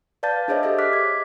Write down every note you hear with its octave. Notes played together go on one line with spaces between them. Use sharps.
B4 D5 F5 A5 G6 A6
D4 G#4 C5 C#5 D#5 E5
G4 A4 C#5 D#5 E5
D6 F6 F#6 B6
G#6